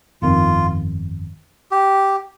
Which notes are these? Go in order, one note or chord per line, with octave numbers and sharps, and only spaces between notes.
G1 F2 D#3 C4 F4
G4